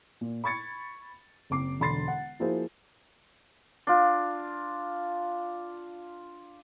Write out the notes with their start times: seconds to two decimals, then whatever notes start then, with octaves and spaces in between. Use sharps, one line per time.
0.21 A#2
0.44 B5 C#6 G#6 A6 C#7
1.50 F#1 C4 D6 C7
1.80 E1 D3 B5 C6 A6 C7
2.08 F#5
2.40 F3 A#3 E4 F#4 G#4 C5
3.87 D4 F4